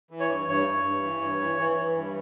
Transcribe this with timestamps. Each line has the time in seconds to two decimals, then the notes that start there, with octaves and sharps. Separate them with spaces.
0.10 E3
0.20 C#5
0.29 G2
0.48 G2 C#5
0.67 G2
0.84 G2
1.03 E3
1.21 G2
1.40 E3
1.59 E3
1.77 E3
1.96 G2